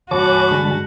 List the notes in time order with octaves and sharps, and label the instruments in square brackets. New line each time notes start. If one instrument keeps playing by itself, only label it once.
[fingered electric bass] G2 E3 [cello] F#4 [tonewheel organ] C#5 A5 D6 [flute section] G#5 B5
[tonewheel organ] D3 G#3 A5